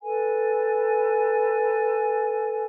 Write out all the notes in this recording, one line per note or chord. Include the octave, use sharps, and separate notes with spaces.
A4 B4 G#5